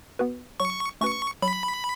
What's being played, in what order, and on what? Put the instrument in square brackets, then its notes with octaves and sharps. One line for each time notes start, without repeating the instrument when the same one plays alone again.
[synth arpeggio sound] B3 F#4 B4
[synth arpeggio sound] F#3 [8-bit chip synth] C#6
[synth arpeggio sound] A3 C#4 F#4 B4 [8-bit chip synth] C#6
[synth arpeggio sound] F#3 [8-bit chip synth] B5